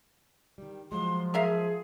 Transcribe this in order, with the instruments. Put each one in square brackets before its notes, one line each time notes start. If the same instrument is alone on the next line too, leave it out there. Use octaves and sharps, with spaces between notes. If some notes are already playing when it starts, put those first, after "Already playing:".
[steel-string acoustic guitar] D#3 G3
[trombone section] F3 [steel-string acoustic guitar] F#3 G#3 [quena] C6
[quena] G#4 [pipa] A#4 E5 F5